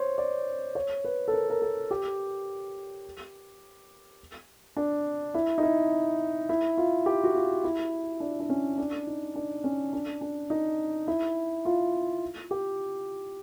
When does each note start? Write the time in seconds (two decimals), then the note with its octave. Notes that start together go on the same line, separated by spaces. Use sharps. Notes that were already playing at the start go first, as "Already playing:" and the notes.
Already playing: C5 C#5
0.18 D5
0.75 C#5
1.05 B4
1.28 A4
1.34 A#4
1.50 A#4
1.62 A4
1.91 G4
4.77 D4
5.34 E4
5.58 D#4
5.63 E4
6.49 E4
6.77 F4
7.06 G4
7.24 F#4
7.35 F4
7.64 E4
8.20 D4
8.40 D4
8.49 C#4
8.78 D4
9.07 D#4
9.36 D4
9.64 C#4
9.93 D4
10.21 D4
10.50 D#4
11.07 E4
11.65 F4
12.51 G4